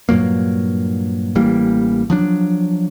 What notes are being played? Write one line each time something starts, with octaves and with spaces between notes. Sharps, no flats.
G2 A#2 F#3 A#3
A1 E3 G3 A#3
F3 F#3 D4